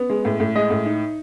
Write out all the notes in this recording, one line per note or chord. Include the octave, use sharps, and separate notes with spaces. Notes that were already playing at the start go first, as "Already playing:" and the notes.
Already playing: B3
G#3
A2
A2
G#3 D#5
A2
D#4